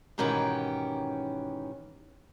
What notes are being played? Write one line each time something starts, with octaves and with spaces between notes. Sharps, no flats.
G#2 B2 D#3 E3 C#4 G4